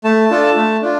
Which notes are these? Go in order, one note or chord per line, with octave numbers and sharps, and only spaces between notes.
A3 A5
D4 F4 A4
A3
D4 F4